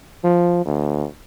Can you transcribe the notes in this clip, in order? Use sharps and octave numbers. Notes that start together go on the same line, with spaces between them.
F3
D2